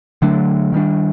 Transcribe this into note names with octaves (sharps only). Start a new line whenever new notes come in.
D3 F#3 A3 D4
D#3 G3 B3 D4